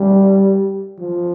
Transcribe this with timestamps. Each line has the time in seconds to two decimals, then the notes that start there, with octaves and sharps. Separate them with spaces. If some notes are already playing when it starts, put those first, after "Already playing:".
Already playing: G3
0.99 F3